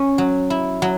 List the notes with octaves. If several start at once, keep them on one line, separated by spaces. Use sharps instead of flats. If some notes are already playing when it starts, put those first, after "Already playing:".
Already playing: C#4
F#3
E4
F#3